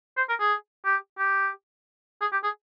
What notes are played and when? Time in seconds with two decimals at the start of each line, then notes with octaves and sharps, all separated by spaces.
0.17 C5
0.29 A#4
0.40 G#4
0.85 G4
1.19 G4
2.21 G#4
2.32 G4
2.44 G#4